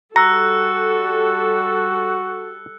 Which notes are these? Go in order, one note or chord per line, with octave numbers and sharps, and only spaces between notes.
G3 F#4 A4 A#5 E6 F#6 C#7